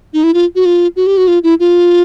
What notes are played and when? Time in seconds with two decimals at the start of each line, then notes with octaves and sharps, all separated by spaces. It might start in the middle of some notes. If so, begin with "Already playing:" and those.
0.13 D#4
0.24 E4
0.34 F4
0.55 F#4
0.66 F4
0.96 F#4
1.07 G4
1.17 F#4
1.28 F4
1.44 E4
1.60 F4